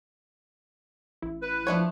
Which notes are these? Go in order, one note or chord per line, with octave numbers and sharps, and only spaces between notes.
A1 E4
B4
F3 A3 D4 C#5